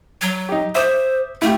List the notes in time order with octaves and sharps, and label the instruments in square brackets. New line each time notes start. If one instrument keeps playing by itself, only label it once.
[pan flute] F#3
[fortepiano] D#4 G4
[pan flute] C5 [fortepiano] E5 D6 D#6
[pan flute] A3 [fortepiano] E4 F4 G4